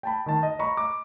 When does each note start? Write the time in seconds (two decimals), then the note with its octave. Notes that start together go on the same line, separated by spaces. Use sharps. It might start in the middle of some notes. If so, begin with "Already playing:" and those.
0.03 G5 A5 B5
0.26 D#3 A5
0.43 D#5
0.59 D#5 A#5 B5 C#6
0.77 D6